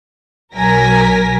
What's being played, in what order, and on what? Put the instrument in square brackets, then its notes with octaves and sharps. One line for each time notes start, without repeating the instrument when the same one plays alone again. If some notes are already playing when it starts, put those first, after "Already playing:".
[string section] B1 F#3 A#4 G#5 A#6 B6